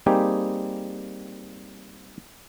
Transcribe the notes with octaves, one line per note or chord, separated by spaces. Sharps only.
G3 A#3 C4 D#4 G4 G#4